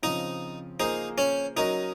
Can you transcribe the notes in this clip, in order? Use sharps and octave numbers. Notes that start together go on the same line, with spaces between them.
C#3 F3 C4 D#4
A#3 D#4 F4 G#4 C5
C#4
F#3 C#4 D#4 F#4 A#4 D#5